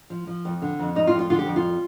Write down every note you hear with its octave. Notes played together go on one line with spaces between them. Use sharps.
F3
F3
F2
D3
F2
G3 D#4
F4
F2
F4
D3 F4
G4
F2
F4
G3